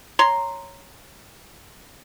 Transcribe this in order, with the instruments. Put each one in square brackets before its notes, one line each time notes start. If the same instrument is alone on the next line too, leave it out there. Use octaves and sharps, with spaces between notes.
[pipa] C#5 A#5 C6